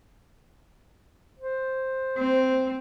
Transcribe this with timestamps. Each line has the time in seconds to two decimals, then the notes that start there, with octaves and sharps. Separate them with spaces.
1.39 C5
2.18 C4